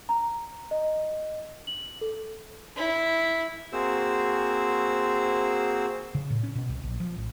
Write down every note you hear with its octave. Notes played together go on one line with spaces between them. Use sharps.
A#5
D#5
F#7
A4
E4
A#3 C4 F#4 G#4 C5 E6
C#3
A2
C#4
B2
C2
A#1
F3
A1